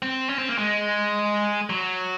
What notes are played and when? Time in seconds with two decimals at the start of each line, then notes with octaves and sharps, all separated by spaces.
0.02 C4
0.29 C#4
0.38 C4
0.49 A#3
0.58 G#3
1.70 F#3